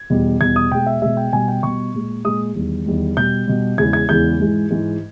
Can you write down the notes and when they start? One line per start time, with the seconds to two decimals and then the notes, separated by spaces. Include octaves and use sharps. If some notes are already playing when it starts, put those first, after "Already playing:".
Already playing: G#6
0.10 E2 B2 G3
0.41 E2 B2 G3 G#6
0.56 D#6
0.71 B2 G#3 G5
0.86 E5
1.02 B2 G#3 E5
1.17 G5
1.33 B2 G3 G#5
1.48 G5
1.63 B2 G3 C#6
1.94 A#2 G#3
2.25 A#2 G#3 D#6
2.56 E2 D#3 G3
2.86 E2 D#3 G3
3.17 B2 G3 G6
3.47 B2 G3
3.78 E2 C#3 E3 G#3 G#6
3.93 G#6
4.09 E2 C#3 E3 G#3 G6
4.39 G#2 E3 G#3
4.71 G#2 E3 G#3